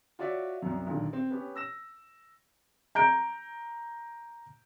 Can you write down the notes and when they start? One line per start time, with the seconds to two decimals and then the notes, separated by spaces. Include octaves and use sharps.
0.19 F4 F#4 C#5 D5 E5
0.62 C2 F#2
0.87 B1 A#2 D3 D#3
1.13 C4
1.30 B3 C#4 G4
1.56 E6 A#6 E7
2.95 A#5 G6 D7